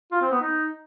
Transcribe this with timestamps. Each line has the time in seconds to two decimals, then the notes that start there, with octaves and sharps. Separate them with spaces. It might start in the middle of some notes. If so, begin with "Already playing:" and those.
0.12 F4
0.22 C4
0.31 B3
0.41 D#4